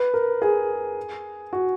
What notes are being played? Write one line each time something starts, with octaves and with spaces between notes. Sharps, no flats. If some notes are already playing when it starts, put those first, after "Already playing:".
Already playing: B4
A#4
G#4
F#4